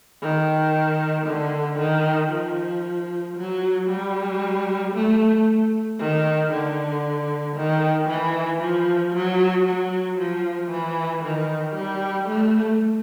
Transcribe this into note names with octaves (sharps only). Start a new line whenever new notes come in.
D#3
D3
D#3
F3
F#3
G3
A3
D#3
D3
D#3
E3
F3
F#3
F#3
F3
E3
D#3
G3
A3